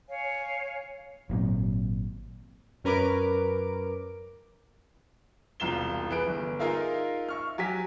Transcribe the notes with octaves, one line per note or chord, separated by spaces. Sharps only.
C#5 F5 G#5
G#1 A#2 F#3 C4
F#2 C#4 A#4 B4 D6 D7
E1 C2 F4 E7 G7
E3 G#4 B4 D7
G1
D#4 F4 G#4 A#4 E5 F5
E5 C#6 F6
F#3 G4 G#5 B6